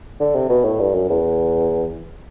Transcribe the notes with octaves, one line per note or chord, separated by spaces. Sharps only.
D3
C3
B2
A2
G2
F#2
E2